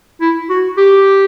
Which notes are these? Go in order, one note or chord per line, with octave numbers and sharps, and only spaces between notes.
E4
F#4
G4